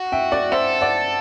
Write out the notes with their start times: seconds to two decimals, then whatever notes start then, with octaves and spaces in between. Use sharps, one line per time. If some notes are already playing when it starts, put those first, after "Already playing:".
Already playing: F#4
0.12 E5 G5
0.32 D5 F#5
0.52 A4 C5 E5
0.81 D5 F#5